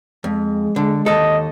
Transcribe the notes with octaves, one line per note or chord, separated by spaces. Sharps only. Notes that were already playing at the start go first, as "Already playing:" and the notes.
F2 G#3
D3
D#2 A4 D#5